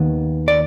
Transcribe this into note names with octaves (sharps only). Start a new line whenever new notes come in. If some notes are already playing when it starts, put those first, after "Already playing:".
Already playing: D#2 D#3 B3
D5